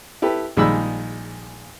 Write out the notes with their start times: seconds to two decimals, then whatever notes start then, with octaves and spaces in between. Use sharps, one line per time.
0.22 E4 G4 A4 B4
0.57 A#1 D#3 G3 G#3 B5 E6